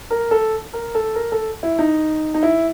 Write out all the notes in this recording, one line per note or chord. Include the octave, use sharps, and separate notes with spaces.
A#4
A4
A#4
A4
A#4
A4
E4
D#4
D#4
E4